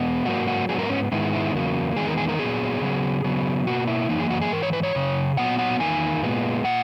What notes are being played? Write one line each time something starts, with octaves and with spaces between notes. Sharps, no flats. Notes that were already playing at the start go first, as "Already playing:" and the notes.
Already playing: E2 B2 G#3 B3
G#2 F#3 A#3 F#4
F#4
G#2 F#3 B3 G#4
A#4
C#4
G#2 D#3 G#3 B3 E4
E4
E2 C#3 F#3 A#3
E2 D#3 G#3 B3 G#4
A#4
G#4
A#4
A#2 F#3 B3 G#4
C#3 F#3 B3
C#3 F#3 B3
B2 A#3 F#4
E4
F#2 E3 A#3 D#4
G#4
F#4
G#4
G#2 E3 A#4
C#5
B4
C#5
F#2 C#3
A#2 F#3 B3 F#5
F#5
E2 D#3 A#3 G#5
A#2 G#3 B3
A#2 F#5